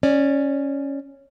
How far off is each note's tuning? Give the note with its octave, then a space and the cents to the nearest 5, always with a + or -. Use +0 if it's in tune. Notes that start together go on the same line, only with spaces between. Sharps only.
C#4 +0 D5 +15